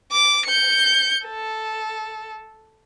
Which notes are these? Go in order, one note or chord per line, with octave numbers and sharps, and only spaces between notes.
D6
G6 C#7
A4